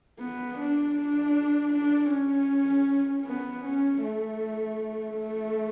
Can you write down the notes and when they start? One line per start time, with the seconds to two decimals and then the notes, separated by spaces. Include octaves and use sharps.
0.20 B3
0.58 D4
0.97 D4
1.73 D4
2.11 C#4
3.26 B3
3.64 C#4
4.03 A3
5.18 A3